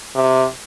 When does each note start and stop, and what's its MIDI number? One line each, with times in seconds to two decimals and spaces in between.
0.16 0.46 48